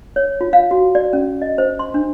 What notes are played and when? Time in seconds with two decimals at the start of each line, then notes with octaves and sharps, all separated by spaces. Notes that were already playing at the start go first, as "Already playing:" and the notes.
0.16 C#5
0.41 F4
0.53 F5
0.71 F#4
0.95 D5
1.13 C#4
1.42 D#5
1.58 C5
1.79 C6
1.94 D4